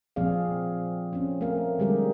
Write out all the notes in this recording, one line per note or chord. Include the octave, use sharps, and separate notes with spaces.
A#2 F3 C4 G#4 D5 F5
C4 C#4
A3 C4 A#4 F5
D3 G3 G#3 G4 G#4 A#4